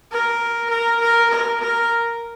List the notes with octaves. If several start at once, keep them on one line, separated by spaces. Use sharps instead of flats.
A#4
A#4
A#4
A#4
A#4